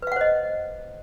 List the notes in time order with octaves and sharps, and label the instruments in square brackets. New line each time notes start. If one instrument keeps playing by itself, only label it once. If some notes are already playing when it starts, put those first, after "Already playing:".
[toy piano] B4
F5
F#5
C5
D#5